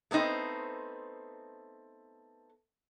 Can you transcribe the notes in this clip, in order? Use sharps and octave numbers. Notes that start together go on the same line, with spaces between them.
A3 B3 C4 D#4 C5